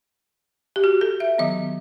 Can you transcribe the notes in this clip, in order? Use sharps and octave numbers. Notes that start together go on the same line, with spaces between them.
G4
F#4
A4
E5
D#3 F#3 B3 D#5